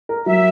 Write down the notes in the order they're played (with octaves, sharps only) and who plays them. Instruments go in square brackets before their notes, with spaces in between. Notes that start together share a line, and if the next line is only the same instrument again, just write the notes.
[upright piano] A#4
[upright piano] F#3 [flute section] E5